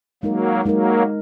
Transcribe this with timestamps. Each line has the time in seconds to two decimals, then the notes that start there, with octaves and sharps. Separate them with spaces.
0.23 F#3 G#3 A#3 D#4 A#4
0.65 F#3 G#3 A#3 D#4 A#4